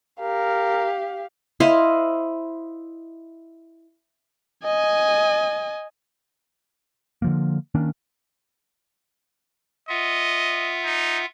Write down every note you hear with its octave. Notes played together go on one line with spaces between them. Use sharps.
G4 A#4 F5
E4 C5 D#5 F5
D#5 G#5
D3 F3 A#3
D#3 A#3 C#4 D4
F4 D#5 E5 F#5
D#4